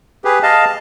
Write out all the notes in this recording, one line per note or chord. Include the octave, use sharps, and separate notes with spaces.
G4 G#4 B4
D#5 F5 A5